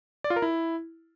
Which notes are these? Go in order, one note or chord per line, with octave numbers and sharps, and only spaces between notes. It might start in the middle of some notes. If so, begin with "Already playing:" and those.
D5
F4
A#4
E4